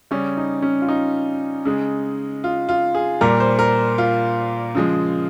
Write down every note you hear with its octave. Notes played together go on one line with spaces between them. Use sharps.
C#3 G3 C#4
D#4
C#4
F4
D#4
C#3 G#3
F4
F4
G#4
A#2 G3 A#4
C5
A#4
F4
C#3 F3 G#3